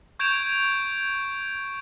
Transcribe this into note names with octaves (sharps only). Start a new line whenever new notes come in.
C#6 G6 G#6 D7 E7 F7